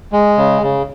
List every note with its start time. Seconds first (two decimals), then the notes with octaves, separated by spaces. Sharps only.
0.13 G#3
0.38 C#3
0.62 C#3